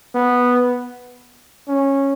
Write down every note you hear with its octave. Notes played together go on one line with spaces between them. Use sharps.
B3
C#4